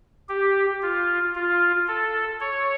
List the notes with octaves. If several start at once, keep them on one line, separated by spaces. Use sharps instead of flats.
G4
F4
F4
A4
C#5